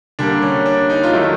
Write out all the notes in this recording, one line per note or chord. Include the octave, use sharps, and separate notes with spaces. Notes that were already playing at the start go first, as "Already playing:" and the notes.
D3 G3 A#3 D4
C#4
D4
D#4
F4
D#3 F#3 A3 E4